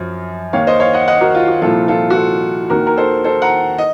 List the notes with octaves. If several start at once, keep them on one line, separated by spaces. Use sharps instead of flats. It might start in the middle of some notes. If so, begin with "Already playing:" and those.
Already playing: F#2 F3
D#2 D#3 C#5 F5
C5 D#5
C#5 F5
D#5 F#5
D#5 F#5
F#4 A#4
F4
F#4
C2 A#2 F3 F4 A4
F4 A4
F#4
F4 A4
D#2 D#3 F#4 A#4
A#4
A4 C5
A4 C5
F#5 A#5
D#5